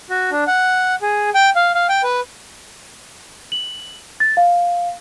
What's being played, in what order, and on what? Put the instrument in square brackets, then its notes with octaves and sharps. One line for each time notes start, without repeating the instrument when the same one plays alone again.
[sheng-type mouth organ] F#4
D4
F#5
G#4
G5
F5
F5
G5
B4
[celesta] F#7
A6
F5